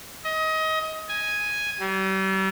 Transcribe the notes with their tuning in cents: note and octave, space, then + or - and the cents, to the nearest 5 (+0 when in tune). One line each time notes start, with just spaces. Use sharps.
D#5 +25
G#5 +0
G3 -40